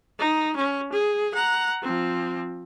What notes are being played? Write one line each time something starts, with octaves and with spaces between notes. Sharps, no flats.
D#4
C#4
G#4
F#5 A#5
F3 C4